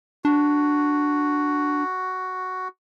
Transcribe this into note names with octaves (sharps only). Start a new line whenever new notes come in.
D4 F#4